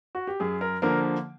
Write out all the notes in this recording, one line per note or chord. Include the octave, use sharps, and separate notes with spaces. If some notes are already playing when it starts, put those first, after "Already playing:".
F#4
G4
F#2 G#4
A#4
D3 F3 A#3 A#4